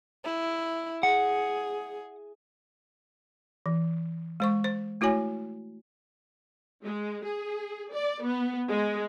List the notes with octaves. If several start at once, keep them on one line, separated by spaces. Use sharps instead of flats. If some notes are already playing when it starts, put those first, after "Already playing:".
E4
G#4 F#5
E3
G#3 C5 C#6
C5
A3 E4 F#4 C#5 G#5
G#3
G#4
D5
B3
G#3